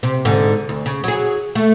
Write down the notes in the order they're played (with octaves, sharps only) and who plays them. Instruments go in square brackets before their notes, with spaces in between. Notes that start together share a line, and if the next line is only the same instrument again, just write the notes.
[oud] C3
G#2 D3
D2
C#3
F#3 G#4
A3